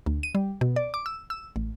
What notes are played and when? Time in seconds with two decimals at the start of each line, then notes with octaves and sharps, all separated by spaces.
0.06 D2
0.23 D#7
0.35 G3
0.61 B2
0.76 D5
0.94 D6
1.06 E6
1.30 E6
1.56 A1